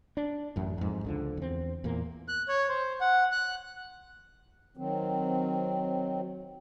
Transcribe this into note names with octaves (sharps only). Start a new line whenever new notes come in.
D4
A1 F#2
F2 G#2
C#2 D3 F3
E2 C4
E2 A#2 A#3
F#6
C#5
C5
F#5
F#6
D#3 F#3 C4